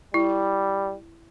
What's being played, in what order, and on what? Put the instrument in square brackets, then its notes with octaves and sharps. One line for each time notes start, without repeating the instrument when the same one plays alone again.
[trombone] G3 [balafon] E4